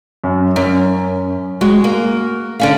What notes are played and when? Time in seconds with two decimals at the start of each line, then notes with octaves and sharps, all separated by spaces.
0.24 F#2
0.56 F#2 C#4
1.61 G#3 F#4
1.84 A#3
2.60 D3 C#4 F5